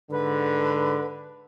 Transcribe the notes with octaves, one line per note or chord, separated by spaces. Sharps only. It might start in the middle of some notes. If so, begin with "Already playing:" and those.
G#2 D3 B4